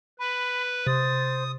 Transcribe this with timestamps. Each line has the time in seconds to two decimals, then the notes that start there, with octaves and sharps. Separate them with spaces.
0.19 B4 B5
0.87 C3 C5 D#6 A6